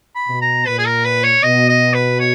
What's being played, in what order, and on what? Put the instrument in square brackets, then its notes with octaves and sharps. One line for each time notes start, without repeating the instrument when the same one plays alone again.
[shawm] B5
[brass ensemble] B2
[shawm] A#5
[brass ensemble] A#2 [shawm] B4
[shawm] G#4
A#4
B4
C#5
[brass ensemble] B2 [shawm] D#5
[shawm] D#5
B4
C#5